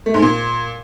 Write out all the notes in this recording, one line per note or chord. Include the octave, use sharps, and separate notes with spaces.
A3
G#2
A#2